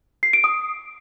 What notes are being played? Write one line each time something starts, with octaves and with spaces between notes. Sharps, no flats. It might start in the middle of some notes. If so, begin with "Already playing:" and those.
C7
D7
D#6